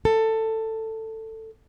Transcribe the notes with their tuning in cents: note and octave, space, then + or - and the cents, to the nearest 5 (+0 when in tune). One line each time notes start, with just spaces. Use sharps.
A4 +15